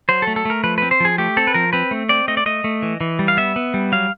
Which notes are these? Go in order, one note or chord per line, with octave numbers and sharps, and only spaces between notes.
F#3 C5
A4
A3
A4
A3 A#4
F3 B4
C4 B4
C5
F3 G#4
A3 G4
C4 A4
B4
F3 A#4
C4 B4
A3
C4 D5
A3 D#5
D5
A3 D#5
A3
E3
E3
G3
F5
B3 E5
B3
G3
F#3 F5